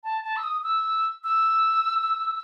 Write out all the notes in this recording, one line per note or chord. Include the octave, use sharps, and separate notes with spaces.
A5
A5
E6
D#6
E6
E6